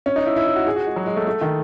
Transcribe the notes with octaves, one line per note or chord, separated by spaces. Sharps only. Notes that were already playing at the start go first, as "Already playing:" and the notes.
C#4
D#4
E4
E4
E4
F#4
G#4
F#4
G#3
F#3
G#3
A3
A3
D#3